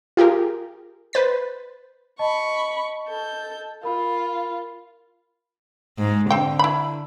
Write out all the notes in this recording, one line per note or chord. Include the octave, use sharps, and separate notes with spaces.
F4 G4 G#4 A#4
B4 C5 A6 B6
D#5 A5 B5 C#6
A4 G6
F4 A#4 B5
G#2
D3 C4 G5
E4 B5